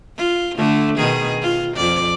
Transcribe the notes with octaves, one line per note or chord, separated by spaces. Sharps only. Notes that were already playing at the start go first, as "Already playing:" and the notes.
F4
D3 A3
B2 D#3 G#4
F4
F2 D5